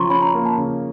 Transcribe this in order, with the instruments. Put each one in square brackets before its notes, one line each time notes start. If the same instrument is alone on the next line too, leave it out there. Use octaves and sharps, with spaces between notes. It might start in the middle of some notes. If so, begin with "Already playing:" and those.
Already playing: [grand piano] C#3 F3 [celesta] A#5 C6 C#6
[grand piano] C#4 [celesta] B5
[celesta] A#5
[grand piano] A#3
[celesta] A5
[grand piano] C#3